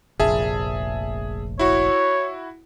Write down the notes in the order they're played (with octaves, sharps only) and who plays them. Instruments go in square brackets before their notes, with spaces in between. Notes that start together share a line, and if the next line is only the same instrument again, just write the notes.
[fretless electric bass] F1 A#1 [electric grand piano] G#4 E5 A5
[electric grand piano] E4 F#4 [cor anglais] C#5